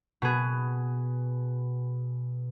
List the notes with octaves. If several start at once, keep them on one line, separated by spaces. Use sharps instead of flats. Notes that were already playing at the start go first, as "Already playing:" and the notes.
B2 B3 G#4